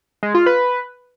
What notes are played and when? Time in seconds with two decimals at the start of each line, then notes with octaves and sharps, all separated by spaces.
0.23 G#3
0.35 F4
0.46 B4